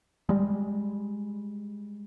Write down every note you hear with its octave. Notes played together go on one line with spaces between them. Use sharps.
G3 G#3